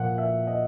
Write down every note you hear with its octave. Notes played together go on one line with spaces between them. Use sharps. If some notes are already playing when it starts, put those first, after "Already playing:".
Already playing: A#2 F3 A#3 F#5
E5
D#5